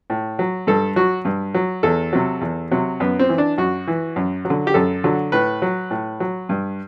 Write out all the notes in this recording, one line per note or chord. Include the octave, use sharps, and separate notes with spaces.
A2
F#3
G2 A4
F#3 F#4
G2
F#3
E2 A4
C3 F#3
E2
C3 F#3
F#2 B3
C4
E3
D4
F#2 F#4
E3
F#2
F#3
D3
G4
F#2 A4
D3 F#3
A2 B4
F#3
A2
F#3
G2